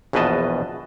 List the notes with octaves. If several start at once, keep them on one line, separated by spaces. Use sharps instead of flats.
A#1 E2 B2 B4 D#5 A5